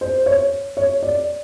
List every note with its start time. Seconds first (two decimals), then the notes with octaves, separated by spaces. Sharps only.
0.01 C5
0.26 C#5
0.77 C#5
1.03 D5